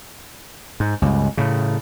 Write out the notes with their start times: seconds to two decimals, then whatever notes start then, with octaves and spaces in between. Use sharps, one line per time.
0.80 G#2
1.02 C#2 G2
1.37 A2 C#3